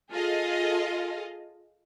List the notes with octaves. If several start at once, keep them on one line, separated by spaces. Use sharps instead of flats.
F4 G#4 A4 D#5 F5